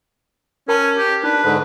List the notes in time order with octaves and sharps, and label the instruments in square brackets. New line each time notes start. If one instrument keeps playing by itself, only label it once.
[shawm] C#4 [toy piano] A#4 G5 A5
[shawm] G4
[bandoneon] D4 [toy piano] D#4 [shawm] B4
[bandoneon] G#2 D3 [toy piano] C5